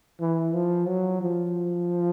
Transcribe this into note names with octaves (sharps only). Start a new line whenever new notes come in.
E3
F3
F#3
F3